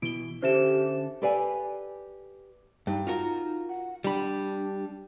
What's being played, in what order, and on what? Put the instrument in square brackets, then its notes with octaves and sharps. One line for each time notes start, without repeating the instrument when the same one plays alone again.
[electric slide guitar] B2 E3 [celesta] D7 G7
[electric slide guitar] D3 C#4 A4 [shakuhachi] G4 [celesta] C5 E5 E7
[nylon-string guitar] G4 A4 B4 D5 F5 G#5
[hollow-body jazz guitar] G2 [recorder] D#4
[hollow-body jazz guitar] F4 F#4 A#4
[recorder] F#5
[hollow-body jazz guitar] G3 B5 [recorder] D4